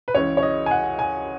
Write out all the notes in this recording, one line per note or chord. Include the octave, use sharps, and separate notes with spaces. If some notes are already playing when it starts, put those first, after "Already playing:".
B4
C#2 C#3 E3 C#5
C#5
D#5
G#5
F#5
G#5